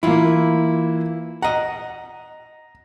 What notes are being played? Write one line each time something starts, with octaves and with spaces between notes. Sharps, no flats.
E3 A#3 E4 F4
D#5 F#5 A#5